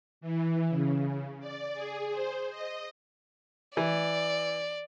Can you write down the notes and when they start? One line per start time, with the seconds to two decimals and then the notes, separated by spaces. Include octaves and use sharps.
0.21 E3
0.70 C#3
1.40 D5
1.74 G#4
2.11 C5
2.50 D#5
3.77 E3 D5